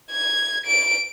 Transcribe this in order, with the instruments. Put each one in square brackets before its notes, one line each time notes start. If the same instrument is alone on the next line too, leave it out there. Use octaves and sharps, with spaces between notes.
[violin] G#6
D7